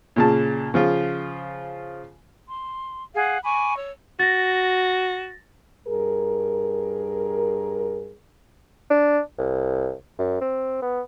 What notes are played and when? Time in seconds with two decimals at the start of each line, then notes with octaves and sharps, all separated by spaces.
0.16 A#2 C#3 A5
0.74 C#3 F3 F4
2.48 C6
3.14 G#4 F5 F#5
3.44 G#5 B5 C#6 D6
3.75 C#5 E6
4.20 F#4 A6 A#6
5.87 G2 G#4 A#4
8.90 D4
9.39 C2
10.19 F#2
10.41 C4
10.82 B3